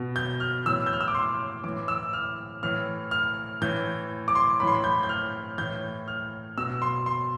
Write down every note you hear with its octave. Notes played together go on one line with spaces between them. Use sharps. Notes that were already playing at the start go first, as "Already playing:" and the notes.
Already playing: B2
G6
F6
A2 E3 E6
G6
F6
E6
D6
C6
A2 E3 D6
E6
F6
A2 E3 F6
F6
A2 E3 G6
D6
C6
A2 E3 B5 C6
B5
G6
G6
F6
A2 E3 G6
F6
B2 E6
C6
C6